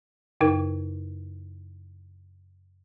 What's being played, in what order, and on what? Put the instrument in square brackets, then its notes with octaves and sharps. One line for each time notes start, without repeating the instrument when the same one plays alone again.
[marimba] F#2 C#3 D#4 A#4